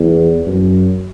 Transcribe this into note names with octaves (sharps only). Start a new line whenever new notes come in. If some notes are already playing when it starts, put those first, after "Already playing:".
Already playing: E2
F#2